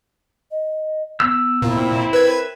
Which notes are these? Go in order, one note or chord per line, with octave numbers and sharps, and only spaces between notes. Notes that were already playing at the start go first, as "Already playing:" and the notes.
D#5
B3 E6
A#2 C4 E4
A#4 B4 G#6